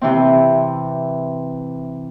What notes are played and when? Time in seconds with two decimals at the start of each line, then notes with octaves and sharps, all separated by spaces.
0.01 C3 E3 C4